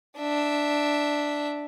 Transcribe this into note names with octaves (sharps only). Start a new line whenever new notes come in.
D4 E5